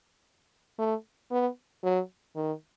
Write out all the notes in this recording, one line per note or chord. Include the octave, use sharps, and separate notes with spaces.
A3
B3
F#3
D#3